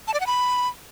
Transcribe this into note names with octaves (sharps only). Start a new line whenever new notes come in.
A5
D5
F#5
B5